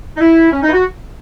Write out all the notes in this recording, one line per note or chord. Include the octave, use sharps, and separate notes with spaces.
D#4
E4
C#4
D#4
E4
F#4